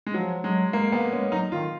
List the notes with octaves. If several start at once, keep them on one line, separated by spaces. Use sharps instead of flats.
G#3
F3 F#3
F#3 G#3
G#3 A#3
A#3 B3
G#3 C#4
F#3 D#4
D#3 F4